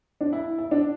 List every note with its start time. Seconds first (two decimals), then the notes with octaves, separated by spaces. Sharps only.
0.21 D4
0.33 E4
0.58 E4
0.71 D4